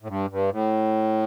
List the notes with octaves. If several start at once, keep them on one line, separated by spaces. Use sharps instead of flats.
A2
G2
G2
A2